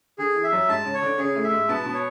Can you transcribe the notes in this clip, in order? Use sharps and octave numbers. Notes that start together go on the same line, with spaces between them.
D3 G#4
E3
E5
F#2 F#3
G#2 G#3 A5
C#3 C#4
C#5
D3 D4
C#3 C#4 G#4
A2 A3
E5
G#2 G#3
B2 B3 A5
B2 B3
C#5